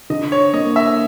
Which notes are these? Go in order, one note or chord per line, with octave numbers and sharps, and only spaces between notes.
D3 D#5
C#5
A#3 D#5
E5